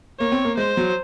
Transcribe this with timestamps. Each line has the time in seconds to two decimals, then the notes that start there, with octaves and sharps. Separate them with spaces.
0.20 A#3 C#5
0.32 C4
0.45 A#3
0.57 G#3 C5
0.77 F#3